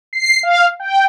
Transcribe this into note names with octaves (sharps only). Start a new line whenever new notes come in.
C7
F5
G5